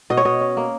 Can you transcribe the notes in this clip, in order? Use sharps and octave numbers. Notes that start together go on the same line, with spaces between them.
B2 D#5
C#5
B2 D#5
C#4
A#3